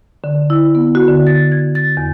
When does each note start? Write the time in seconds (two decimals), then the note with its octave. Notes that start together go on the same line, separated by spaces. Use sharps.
0.24 D3
0.50 E4
0.75 B3
0.95 F#4
1.08 D3
1.27 A6
1.52 G#6
1.75 A6
1.97 E2